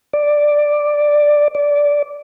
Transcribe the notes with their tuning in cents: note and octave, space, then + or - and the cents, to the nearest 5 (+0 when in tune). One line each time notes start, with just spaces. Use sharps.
D5 +5
D5 -15